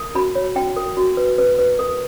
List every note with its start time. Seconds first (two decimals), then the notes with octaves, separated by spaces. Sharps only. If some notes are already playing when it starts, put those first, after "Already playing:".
Already playing: A#4
0.15 F#4 B5
0.35 C#5
0.56 F#4 G5
0.76 A#4
0.97 F#4
1.17 B4
1.38 B4
1.59 B4
1.79 A#4